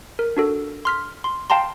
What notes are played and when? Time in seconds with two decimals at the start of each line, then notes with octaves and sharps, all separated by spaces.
0.19 A#4
0.37 D4 F#4 A4
0.85 C6 F6 B6
1.24 C6
1.50 F5 G5 A5 A#5 C6